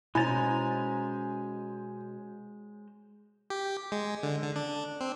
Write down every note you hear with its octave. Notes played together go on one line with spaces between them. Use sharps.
B2 G#3 C#4 E4 C5 G#5 A#5 A6
G4
G#3
D3
D3
D4
C4